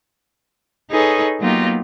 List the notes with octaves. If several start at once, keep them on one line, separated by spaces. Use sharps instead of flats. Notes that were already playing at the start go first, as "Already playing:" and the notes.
D#4 G#4 A4 B4 C#5
F#3 A#3 B3 D#4 F4 G4